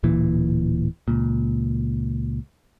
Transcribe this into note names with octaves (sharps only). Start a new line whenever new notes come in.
D1 A#2 E3
C#2 A#2